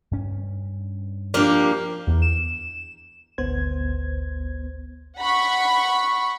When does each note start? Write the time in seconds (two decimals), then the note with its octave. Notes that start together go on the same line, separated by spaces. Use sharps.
0.11 G2 C#4
1.34 F3 A#3 D4 G4
2.07 E2
2.22 E7
3.38 G#1 D2 B3 C5 G#6
5.18 F#5 B5 C#6